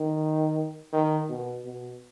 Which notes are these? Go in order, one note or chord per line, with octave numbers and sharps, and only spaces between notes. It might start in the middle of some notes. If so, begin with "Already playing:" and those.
Already playing: D#3
D#3
B2
B2